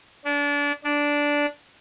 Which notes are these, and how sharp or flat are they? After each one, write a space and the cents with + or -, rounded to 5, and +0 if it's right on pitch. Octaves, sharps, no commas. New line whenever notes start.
D4 -30
D4 -10